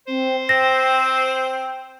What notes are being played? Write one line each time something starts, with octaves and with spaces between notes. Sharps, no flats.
C4 C5
C4 G5 A#6